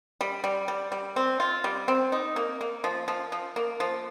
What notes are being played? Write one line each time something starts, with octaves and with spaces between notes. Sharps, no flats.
G3
G3
G3
G3
C4
F4
G3
C4
D#4
A#3
A#3
F3
F3
F3
A#3
F3